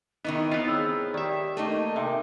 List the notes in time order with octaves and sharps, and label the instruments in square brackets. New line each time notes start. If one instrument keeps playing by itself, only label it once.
[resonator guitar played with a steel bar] D#3 E3 D#4 [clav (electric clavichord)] B3 [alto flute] E4
[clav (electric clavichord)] B3 F4 [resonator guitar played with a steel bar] C4
[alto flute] G#4 [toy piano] C#5 B5 E6
[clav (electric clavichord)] D#3 E5 [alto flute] G4 [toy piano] D5 G5
[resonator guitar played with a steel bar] A3 A#3 D#4 [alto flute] A5
[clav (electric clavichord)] C3 [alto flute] A#4 [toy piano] E5 G5 G#5